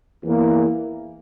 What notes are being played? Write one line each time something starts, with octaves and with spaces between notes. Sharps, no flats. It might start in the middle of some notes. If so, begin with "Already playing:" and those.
E2 E3 A#3